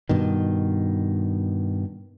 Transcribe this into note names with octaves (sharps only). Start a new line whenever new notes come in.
G2 B2 D#3